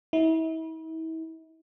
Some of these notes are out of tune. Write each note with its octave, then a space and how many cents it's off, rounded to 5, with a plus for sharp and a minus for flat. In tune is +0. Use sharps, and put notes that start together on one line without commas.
E4 -40